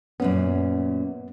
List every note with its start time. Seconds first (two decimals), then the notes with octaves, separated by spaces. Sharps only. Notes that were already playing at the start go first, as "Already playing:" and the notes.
0.20 F#2 A#2 B3 C#4